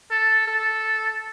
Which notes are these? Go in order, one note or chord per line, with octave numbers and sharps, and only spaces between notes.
A4
A4